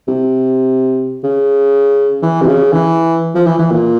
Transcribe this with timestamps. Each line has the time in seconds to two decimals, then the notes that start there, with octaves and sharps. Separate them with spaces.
0.08 C3
1.24 C#3
2.22 E3
2.41 C3
2.48 C#3
2.73 E3
3.35 F3
3.47 E3
3.59 E3
3.71 A#2